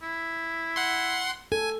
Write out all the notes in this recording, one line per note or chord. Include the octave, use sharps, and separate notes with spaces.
E4
F#5 C6
A4 G#5